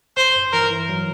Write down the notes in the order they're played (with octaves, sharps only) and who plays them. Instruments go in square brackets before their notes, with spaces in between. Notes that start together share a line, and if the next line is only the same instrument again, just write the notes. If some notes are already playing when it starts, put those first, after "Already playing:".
[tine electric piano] G1 [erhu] C5
[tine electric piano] G2
[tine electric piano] E3 [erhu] A#4
[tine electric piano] E3
F#3